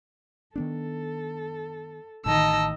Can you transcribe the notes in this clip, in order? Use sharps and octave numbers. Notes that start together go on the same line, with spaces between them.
D#3 B3 D4 A4
A1 A2 D#3 D#5 A5 E6